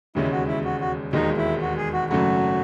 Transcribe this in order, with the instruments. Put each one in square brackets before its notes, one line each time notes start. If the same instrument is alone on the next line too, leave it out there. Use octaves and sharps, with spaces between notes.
[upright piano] E1 D#2 C#3 G#3 C#4 [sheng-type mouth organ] E4
[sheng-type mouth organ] F#4
E4
F#4
F#4
[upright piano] E1 D#2 D#3 G#3 [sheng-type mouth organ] D#4
[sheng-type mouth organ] E4
F#4
G#4
F#4
[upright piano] G#1 F#2 C#3 F#3 A3 [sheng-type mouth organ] F#4